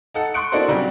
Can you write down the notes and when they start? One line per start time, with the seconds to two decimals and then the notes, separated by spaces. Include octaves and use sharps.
0.14 D#4 A4 F#5
0.34 C6 C#6 D#6 F#6 C#7 D7
0.52 A#3 D4 E4 F#4 A4 C5
0.68 C#3 F#3 G3 C4 D4 F#4